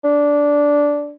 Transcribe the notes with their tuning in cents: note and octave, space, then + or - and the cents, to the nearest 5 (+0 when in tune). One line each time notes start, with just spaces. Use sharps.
D4 -10